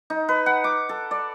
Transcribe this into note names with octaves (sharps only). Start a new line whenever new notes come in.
D#4
B4
F#5
D6
A4
D5